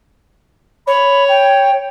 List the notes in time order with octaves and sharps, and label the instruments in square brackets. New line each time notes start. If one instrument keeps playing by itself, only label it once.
[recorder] C#5 [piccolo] B5
[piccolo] G5